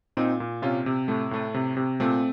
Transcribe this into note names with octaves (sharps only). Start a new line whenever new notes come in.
A#2 C4 D#4
A#2
C3 C#4 F4
C3
A2 A3
A2 A3
C3
C3
A#2 A3 C4